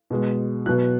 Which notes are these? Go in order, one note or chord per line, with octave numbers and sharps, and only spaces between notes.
B2 G#3
B2 F#3 F#6